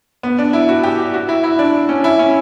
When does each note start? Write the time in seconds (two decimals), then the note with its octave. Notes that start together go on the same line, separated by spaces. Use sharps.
0.23 B3
0.39 D4
0.53 E4
0.69 F#4
0.84 G4
1.14 F#4
1.29 E4
1.44 E4
1.59 D4
1.89 C#4
2.04 E4
2.19 C#4